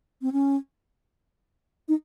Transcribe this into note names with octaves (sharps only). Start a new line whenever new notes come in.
C4
C#4
D#4